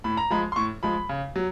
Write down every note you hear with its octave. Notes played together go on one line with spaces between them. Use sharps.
A2 B5
A#5
F3 G#3 B5
C6
A2 C#6
F3 G#3 B5
C#3
F#3